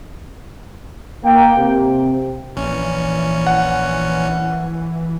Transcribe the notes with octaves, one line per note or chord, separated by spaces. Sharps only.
A#3 G5
C3
A#1 E3 C#4
F#5